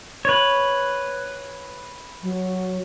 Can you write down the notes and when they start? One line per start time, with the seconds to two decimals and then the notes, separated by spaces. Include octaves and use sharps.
0.25 B4 C#5
2.22 F#3